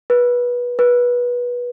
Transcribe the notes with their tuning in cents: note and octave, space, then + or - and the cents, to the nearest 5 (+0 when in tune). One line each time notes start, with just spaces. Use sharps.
B4 -20
B4 -20